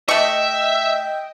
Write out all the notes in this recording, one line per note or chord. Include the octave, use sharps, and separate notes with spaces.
A3 D#5 E5 G5 C#6